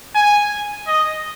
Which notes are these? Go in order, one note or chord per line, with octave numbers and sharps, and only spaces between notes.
G#5
D#5